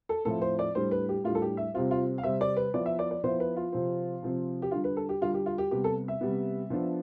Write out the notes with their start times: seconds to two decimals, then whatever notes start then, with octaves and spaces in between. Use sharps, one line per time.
0.09 A4
0.25 A2 F3 C4 E4 A4
0.42 C5
0.59 D5
0.75 A2 G3 D4 C5
0.91 B4
1.09 G4
1.24 A2 G3 D4 F4
1.35 A4
1.42 G4
1.57 E5
1.74 C3 G3 C4 F4
1.91 F4
2.18 F5
2.23 C3 G3 C4 E5
2.41 D5
2.57 B4
2.74 F3 B3 E4 D5
2.86 E5
2.99 D5
3.11 D5
3.24 F3 B3 E4 C5
3.40 B4
3.57 F4
3.72 C3 F3 C4
4.23 C3 F3 C4
4.62 G4
4.71 D3 G3 D4 F4
4.84 B4
4.97 A4
5.09 G4
5.21 D3 G3 D4 F4
5.34 G4
5.46 F4
5.58 G4
5.71 C3 G3 B3 G4
5.84 A4
6.08 E5
6.21 C3 G3 B3
6.70 F3 B3 D4